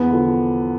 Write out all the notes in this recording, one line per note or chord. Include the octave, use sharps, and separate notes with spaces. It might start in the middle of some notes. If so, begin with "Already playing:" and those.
Already playing: E2 B3
D3 F3